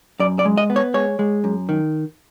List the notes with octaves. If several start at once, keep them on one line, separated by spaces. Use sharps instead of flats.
F#2 D5
D5
G#3
D#5
B3
C#5
G#3 C#5
G#3
F#2
D#3